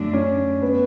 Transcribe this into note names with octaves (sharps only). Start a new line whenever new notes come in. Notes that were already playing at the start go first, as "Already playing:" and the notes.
Already playing: F#2 D3 F#3 A3 D4
C#4
B3